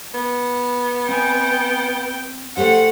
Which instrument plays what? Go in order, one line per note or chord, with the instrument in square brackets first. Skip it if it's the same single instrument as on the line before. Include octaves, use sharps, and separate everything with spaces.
[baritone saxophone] B3
[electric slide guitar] C4 D#5 G#5 [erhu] G5
[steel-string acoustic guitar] A3 G4 C5 [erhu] F#5